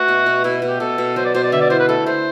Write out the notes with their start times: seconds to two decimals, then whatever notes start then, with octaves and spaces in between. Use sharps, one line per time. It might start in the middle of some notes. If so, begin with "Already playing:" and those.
Already playing: A3 F#4 B4
0.08 B2
0.26 B2
0.44 B2 E4
0.62 B2
0.69 G4
0.80 B2 A4
0.98 B2
1.16 F#3 C5
1.25 D5
1.35 B2 C5
1.44 D5
1.52 D3 E5
1.61 D5
1.70 E4 C5
1.79 B4
1.88 A3 A4
2.07 A3 C5